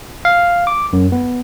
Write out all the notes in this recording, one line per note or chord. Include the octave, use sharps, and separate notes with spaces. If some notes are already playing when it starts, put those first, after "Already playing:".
F5
D6
F#2
B3